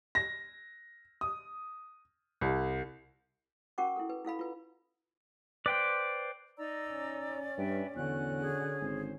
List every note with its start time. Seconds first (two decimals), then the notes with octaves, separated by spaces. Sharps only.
0.15 A#6
1.21 D#6
2.41 C2
3.78 C#4 F#4 A#4 F#5 C#6 D6
3.96 E4 A4
4.09 B4
4.25 E4 A4 F5 B5
4.39 F4 B4
5.66 B4 C5 D5 G5
6.58 D#4 D5 A#5 E6
6.90 C#4
7.58 G2 B4 E5 G5
7.96 E2 D3 C#4 F#4 D5 F#6
8.41 G#4
8.81 G#1 C5